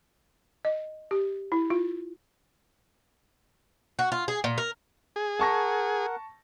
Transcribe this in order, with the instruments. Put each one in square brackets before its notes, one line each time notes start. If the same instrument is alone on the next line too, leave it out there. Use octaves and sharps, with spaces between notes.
[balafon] D#5
G4
E4
F4
[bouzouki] F#4
F4
G#4
A#2
A#4
[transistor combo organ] G#4
[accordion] A#4 F#5 [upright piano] A5 C#6 A#6